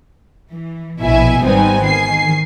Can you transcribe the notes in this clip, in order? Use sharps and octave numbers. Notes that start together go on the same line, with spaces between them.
E3
A#1 B2 E4 E5 G#5
G#1 G3 B3 C4 D#4 G#5
D#3 G#5 C7